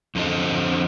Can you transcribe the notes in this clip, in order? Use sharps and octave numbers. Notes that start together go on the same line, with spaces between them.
F2 D3 C4 A4 D#5